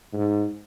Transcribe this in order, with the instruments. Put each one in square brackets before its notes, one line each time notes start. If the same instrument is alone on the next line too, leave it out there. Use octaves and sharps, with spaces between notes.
[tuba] G#2